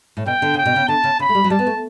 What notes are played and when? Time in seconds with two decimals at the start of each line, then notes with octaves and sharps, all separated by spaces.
0.17 A2
0.26 B2 G5
0.42 D3
0.54 C#3 G5
0.65 B2
0.76 C#3
0.88 D3 A5
1.04 C#3
1.19 C#3 B5
1.29 A3
1.35 G3
1.44 F#3
1.50 G3 A5
1.59 B3
1.67 A3